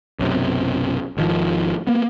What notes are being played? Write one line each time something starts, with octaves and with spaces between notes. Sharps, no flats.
B1 F#2 C3
G#1 D#3 F3
A#3 B3